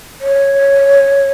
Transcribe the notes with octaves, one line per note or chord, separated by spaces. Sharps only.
C#5